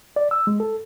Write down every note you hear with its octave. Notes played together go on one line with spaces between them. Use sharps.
D5
E6
G#3
A4